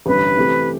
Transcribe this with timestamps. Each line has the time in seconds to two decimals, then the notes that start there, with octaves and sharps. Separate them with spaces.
0.06 A1 G2 D3 B4
0.37 C3 E3 A3 C4 G4